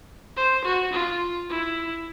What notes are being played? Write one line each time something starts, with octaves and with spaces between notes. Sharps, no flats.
C5
F#4
F4
E4